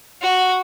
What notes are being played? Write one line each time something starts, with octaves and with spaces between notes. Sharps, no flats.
F#4